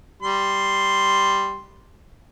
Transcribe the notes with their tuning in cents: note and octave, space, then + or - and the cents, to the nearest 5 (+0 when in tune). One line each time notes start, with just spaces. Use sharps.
G3 +0 C6 +0